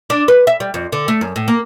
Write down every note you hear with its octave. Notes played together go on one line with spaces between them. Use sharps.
D4
B4
E5
G3
F2
D3
A3
F#2
A2
A#3